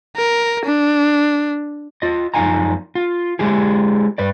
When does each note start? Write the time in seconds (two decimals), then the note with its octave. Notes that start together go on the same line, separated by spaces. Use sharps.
0.17 A#4
0.65 D4
2.02 F4 D#5
2.34 F#2 F3 D#4 F5 G#5 A#5
2.95 F4
3.39 G#3 E4 G4 G#4
4.18 G2 B4 D5